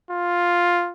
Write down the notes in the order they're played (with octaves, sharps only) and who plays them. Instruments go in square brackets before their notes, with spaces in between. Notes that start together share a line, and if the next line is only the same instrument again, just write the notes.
[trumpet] F4